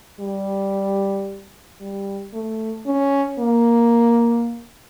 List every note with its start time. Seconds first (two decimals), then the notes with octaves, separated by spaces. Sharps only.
0.20 G3
1.81 G3
2.34 A3
2.87 C#4
3.39 A#3